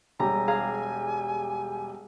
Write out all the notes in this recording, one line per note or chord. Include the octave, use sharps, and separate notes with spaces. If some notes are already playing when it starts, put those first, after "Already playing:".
E1 G3 G4 G#5 A#5
G#4 F5 A#5